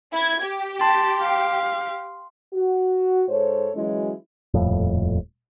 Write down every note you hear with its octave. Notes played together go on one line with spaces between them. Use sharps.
E4 G#6
G4
A5 C6
F5
F#4
G#2 A4 C5 C#5
E3 F#3 G#3 C#4 E4 F#4
D#1 F2 A2